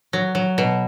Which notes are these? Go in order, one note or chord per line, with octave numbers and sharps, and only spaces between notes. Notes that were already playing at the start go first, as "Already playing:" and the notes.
F#3
F#3
B2